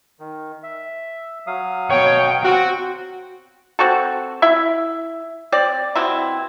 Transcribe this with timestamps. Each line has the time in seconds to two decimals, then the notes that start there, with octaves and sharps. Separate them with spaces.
0.20 D#3
0.63 E5
1.47 F#3 F5 D#6
1.91 B2 C#5 G5
2.44 C4 F#4
3.79 C4 F#4 A4
4.42 E4 E5
5.52 C4 D5
5.96 B2 C4 E4